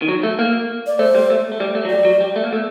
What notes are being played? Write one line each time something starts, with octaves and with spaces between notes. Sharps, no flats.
D#3
F#3
A3
A#3
D5
A3 C5
G3
A3
A3
G3
A3
F#3
G3 D5
F#3
G3
A3
A#3
A3